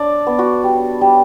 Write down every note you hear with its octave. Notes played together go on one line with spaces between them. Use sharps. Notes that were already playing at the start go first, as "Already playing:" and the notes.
Already playing: D4 D5
B3
F#4
G3
G3